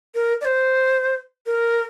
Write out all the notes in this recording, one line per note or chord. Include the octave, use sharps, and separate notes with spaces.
A#4
D5
C5
A#4